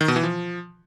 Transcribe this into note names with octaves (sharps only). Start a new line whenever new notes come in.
D#3
B2
E3
F3